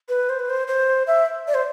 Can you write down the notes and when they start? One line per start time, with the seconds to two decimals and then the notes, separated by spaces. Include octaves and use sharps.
0.09 B4
0.29 C5
0.39 B4
0.50 C5
0.68 C5
1.07 E5
1.48 D5
1.54 C5